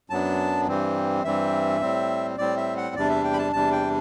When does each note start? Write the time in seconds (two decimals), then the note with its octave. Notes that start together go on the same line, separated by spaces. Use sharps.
0.10 F#2 F#3 B3 D4 A5
0.67 G2 E3 G3 C4
1.24 G2 E3 G3 C4 E5
1.81 A2 G3 C4
2.38 A2 G3 C4 D5
2.57 E5
2.77 F#5
2.96 E2 C3 G3 D4 D5
3.09 E5
3.24 G5
3.33 B5
3.38 A5
3.53 E2 C3 G3 D4 A5
3.72 G5